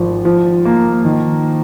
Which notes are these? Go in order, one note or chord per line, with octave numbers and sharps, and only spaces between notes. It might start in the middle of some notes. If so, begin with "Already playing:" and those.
Already playing: G#1 F3
F3
A#3
D#3